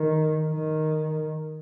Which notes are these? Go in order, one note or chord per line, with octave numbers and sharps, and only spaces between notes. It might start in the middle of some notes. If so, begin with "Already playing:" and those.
Already playing: D#3
D#3